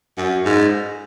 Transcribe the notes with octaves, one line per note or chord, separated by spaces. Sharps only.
F#2
G#2